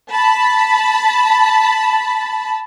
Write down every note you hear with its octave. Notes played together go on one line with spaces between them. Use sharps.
A5 B5